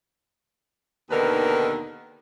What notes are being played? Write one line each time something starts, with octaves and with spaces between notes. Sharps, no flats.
D#2 B2 D3 D#3 A#4 B4